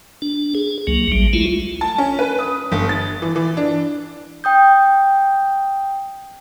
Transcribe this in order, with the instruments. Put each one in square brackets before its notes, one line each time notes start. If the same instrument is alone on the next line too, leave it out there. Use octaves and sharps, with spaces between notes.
[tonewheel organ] D4
G#4
C#2 F#3 A#3
A1 F#3 G3
G#3 A3 E4 F4
[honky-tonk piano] A5
C#4
B4
D#6
G1
A6
E3
E3
D4
[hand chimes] G5 D#6 G6